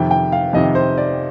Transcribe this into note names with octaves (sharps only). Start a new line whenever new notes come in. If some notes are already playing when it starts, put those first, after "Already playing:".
Already playing: F2 C3 D#3 G5
G5
F5
F2 C3 D#3 D#5
C5
D5